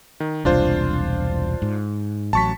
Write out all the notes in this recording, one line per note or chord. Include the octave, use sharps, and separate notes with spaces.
D#3
E1 C2 D4 F4 C5
G#2
A1 F#3 A5 C#6 B6